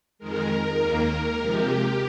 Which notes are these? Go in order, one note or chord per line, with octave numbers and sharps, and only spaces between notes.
F2 D#3 G#3 A#4
D#2 D#3 A#3
C3 F3 G#3 G4